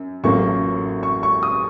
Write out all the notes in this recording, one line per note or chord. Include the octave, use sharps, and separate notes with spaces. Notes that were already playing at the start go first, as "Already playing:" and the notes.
Already playing: F#2
A1 A2 F#3 A#3 F4 C#6
C#6
C#6
D#6